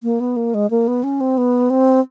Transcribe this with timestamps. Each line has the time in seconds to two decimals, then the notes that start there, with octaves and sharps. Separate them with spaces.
0.03 A#3
0.20 B3
0.36 A#3
0.54 G#3
0.70 A#3
0.88 B3
1.03 C#4
1.20 C4
1.37 B3
1.70 C4